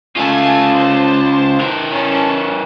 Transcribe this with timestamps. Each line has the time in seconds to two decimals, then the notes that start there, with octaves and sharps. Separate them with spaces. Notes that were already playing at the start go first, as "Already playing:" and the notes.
0.16 C#3 A3 F4 G#5 A5
0.75 C5 A5
1.60 E3 A#4
1.92 C#4 A5